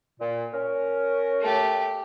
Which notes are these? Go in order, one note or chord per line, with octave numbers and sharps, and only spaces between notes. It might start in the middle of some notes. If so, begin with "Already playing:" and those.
A#2
C#4 A#4
A3 G4